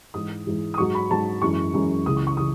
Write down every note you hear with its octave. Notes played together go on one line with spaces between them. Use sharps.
G#2 E3 G#3 D#6
G#2 E3 G#3
D#6
G#2 F#3 C#6
B5
G#2 F#3 A5
F#2 E3 G#3 C#6
F#2 E3 G#3
C#2 C#3 E3 D#6
C#6
C#6
C#3 E3 D#6